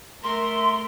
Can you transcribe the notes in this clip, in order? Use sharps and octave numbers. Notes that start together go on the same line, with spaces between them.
A3 A#4 E5 C6